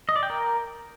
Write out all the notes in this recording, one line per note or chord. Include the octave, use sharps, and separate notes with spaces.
D#5
D5
G5
A#4